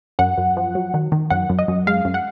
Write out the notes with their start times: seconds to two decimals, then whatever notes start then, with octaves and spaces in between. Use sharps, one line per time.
0.19 F#2 F#5
0.38 F#2
0.57 F3
0.75 F#3
0.94 D#3
1.12 D#3
1.30 F#2 F#5
1.50 F#2
1.59 D#5
1.68 F#2
1.87 G#3 F5
2.05 F#2
2.14 F#5